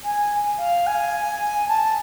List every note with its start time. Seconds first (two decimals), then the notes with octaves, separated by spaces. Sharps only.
0.05 G#5
0.59 F5
0.87 G#5
1.68 A5